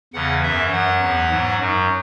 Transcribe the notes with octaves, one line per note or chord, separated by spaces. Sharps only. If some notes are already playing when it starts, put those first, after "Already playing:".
E2 C#3 E3 F#5
F#2 E3 E5
F#2 F#3 F#5
E2 E3
G#2 F#3
F#2 F#3